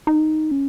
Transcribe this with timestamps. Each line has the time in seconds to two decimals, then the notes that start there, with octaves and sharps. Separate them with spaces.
0.07 D#4
0.51 C#4